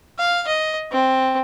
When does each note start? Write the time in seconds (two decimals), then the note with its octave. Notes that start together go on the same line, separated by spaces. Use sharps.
0.19 F5
0.47 D#5
0.92 C4